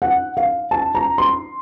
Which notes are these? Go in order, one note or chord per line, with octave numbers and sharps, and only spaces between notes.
F#5
F5
A5
A#5
C6